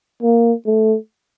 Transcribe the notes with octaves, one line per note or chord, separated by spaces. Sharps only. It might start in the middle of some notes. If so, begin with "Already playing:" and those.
A#3
A3